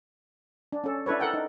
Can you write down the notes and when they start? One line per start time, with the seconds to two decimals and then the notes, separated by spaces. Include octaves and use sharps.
0.72 D4
0.84 C#4 A4
1.06 D4 E4 A4 B4 C#5
1.20 A4 A#4 F#5 G5
1.34 D#4